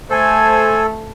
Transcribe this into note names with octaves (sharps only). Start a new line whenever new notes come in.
A3 A4 C5 G#5